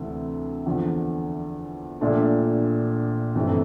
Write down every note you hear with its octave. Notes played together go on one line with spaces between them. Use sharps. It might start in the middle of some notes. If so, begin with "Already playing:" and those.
Already playing: D2 C3 E3 A3
E2 D3 F3
A#1 A#2 A3 D4 F4
G1 F2 C3 E3 A3